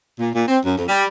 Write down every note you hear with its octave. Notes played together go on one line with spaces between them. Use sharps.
A#2
A#2
C4
F#2
F2
G3